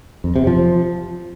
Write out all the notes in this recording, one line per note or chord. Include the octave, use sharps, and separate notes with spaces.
F2
C3
F3